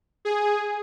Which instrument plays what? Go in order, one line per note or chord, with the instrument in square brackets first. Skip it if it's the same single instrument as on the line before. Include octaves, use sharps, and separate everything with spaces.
[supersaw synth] G#4